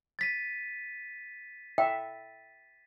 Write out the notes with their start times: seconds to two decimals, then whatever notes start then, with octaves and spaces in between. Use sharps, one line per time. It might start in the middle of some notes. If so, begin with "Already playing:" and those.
0.19 A6 B6 D#7
1.78 E5 G5